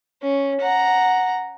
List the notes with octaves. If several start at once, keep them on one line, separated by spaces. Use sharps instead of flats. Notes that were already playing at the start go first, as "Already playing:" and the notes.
C#4
F#5 A#5